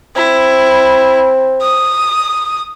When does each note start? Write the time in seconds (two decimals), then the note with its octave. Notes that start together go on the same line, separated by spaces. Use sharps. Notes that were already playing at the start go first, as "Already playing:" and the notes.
0.16 C4 E4
1.62 D#6